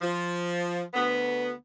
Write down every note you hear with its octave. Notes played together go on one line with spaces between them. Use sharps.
F3
D2 B3